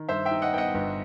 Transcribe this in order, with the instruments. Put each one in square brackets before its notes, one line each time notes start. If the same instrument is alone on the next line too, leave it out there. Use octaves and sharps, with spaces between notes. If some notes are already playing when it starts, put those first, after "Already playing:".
Already playing: [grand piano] D#3
[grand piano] G2 [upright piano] C5 E5
[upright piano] E5 G5
[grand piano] D#4
[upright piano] D#5 F#5
[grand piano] B3 [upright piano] G5
[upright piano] D#5 F#5
[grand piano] G1